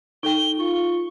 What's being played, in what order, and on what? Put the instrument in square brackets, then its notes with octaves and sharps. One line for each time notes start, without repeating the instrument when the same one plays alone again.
[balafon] D#4 A4 G5 [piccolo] G7
[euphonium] F4 [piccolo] C#6